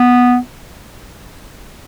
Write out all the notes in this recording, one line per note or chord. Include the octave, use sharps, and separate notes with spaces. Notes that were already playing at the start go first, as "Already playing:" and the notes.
Already playing: B3